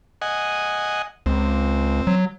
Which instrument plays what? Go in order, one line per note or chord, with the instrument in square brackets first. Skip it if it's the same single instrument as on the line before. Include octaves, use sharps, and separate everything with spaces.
[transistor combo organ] D#5 F#5 G#5
[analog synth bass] C#2 [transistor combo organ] C4
[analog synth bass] F#3